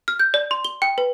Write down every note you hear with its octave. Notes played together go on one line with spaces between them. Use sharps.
F6
G6
D5
C6
G7
G5
B4